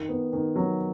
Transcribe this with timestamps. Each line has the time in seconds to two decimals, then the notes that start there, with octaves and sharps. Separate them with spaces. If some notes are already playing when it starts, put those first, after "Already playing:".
Already playing: D#3
0.09 B3
0.33 D#3
0.56 F#3